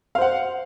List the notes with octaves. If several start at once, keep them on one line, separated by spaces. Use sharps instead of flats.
C5 F5 F#5